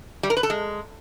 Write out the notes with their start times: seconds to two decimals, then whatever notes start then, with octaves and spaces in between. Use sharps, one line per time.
0.23 G3
0.30 A#4
0.37 B4
0.43 A4
0.50 G#3